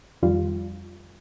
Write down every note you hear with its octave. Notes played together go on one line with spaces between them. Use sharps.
F2 D#3 G3 F4